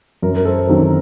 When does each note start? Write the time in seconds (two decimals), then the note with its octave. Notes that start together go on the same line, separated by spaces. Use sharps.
0.22 F#2 A#4
0.36 A#4
0.45 A4 C5
0.69 D#3 F#3 C4